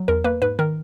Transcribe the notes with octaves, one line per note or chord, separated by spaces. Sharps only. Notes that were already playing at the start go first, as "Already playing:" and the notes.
Already playing: F#3
E2 A#4
A#3 B4
G#2 B4
D#3 A#4